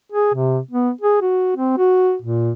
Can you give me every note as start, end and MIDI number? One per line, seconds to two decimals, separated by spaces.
0.12 0.32 68
0.34 0.58 48
0.71 0.90 59
1.01 1.18 68
1.21 1.56 66
1.57 1.74 60
1.78 2.15 66
2.22 2.51 46